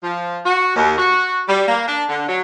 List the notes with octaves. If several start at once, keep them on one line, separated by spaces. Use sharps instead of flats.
F3
F#4
D#2
F#4
G3
A#3
D4
D3
F#3